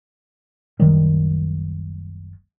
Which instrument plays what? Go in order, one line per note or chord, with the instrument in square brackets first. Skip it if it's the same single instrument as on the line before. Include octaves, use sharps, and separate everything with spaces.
[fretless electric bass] F#1 C2 D#3 G3